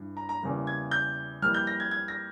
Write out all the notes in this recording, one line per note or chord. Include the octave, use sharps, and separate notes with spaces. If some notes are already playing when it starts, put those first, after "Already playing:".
Already playing: G2 E3
A#5
A#5
E2 C#3 G3 A#3
G#6
G6
F2 E3 G3 A#3 F6
G6
A#6
G#6
G#6
A#6